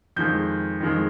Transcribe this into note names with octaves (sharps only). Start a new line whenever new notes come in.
F2 D#3 G#3 G6
F2 D#3 G#3